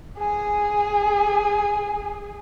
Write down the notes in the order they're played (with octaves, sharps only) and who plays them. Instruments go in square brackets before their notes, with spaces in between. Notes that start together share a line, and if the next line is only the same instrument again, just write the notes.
[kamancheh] G#4 G#5